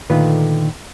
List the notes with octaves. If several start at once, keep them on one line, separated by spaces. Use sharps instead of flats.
A#2 D3 D#3 A3 F4 B4